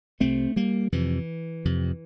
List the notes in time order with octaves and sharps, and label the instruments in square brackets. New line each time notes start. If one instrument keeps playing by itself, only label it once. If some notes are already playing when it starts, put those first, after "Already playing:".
[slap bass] C2 C3 A3 C4
G3 A#3
F2 C3 E3
F2 C3